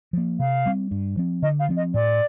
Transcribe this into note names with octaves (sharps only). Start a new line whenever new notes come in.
F3 A#3
C3 F5
G3 C4
G2
F3 C4
D3 D#5
F5
F3 C4
D#5
A2 D5